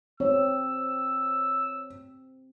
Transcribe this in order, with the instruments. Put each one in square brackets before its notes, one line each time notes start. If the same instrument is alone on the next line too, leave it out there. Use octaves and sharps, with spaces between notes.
[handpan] C4 [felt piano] C#5 [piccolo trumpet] E6